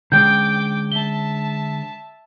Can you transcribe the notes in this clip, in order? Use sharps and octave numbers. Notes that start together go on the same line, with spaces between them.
D3 G#3 C#4 G5 D6 G6
E5 A5 G7